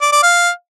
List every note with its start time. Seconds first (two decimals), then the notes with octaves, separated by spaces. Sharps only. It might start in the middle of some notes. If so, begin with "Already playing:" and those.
0.01 D5
0.12 D5
0.23 F5